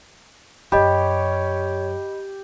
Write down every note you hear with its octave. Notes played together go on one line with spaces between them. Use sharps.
F#2 C3 G4 C#5 D#5 B5